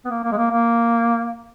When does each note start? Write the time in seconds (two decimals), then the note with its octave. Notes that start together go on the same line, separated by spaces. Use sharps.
0.05 B3
0.10 A#3
0.24 A#3
0.32 G#3
0.37 A#3
0.50 A#3